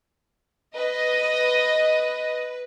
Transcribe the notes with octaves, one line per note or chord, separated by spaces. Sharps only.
B4 D#5